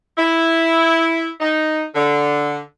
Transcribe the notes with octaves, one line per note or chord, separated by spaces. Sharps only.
E4
D#4
D3